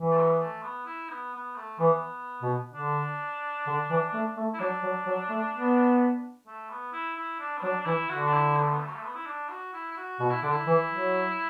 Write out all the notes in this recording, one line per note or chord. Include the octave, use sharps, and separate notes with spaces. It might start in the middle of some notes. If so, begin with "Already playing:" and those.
Already playing: E3
A3
F#3
B3
A3
B3
E4
B3
B3
A3
E3 B3
B2
D3 D4
D3
E3
A3
A3
E4
F#3 D4
F#3
F#3
A3
B3
A3
B3
E4
E4
D4
B3
F#3 D4
D4
E3 E4
D3 F#4
D4
E4
B3
A3
B3
A3
F#3
A3
B3
E4
D4
F#4
E4
E4
F#4
B2 F#4
E4
D3 D4
E4
E3
F#3